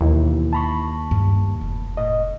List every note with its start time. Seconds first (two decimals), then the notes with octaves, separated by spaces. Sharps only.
0.01 D#2 B2 E3 E4
0.53 A5 B5 C#6
1.11 G2 A#3
1.61 F1
1.97 A2 D#5